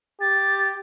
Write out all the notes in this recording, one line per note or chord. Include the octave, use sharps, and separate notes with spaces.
G4 A6